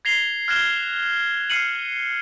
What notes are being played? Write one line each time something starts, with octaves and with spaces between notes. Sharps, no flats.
G#6 A#6 C7 F7 G7
F6 F#6 G#6 A#6 E7 G7
F6 C7 C#7 D#7 F#7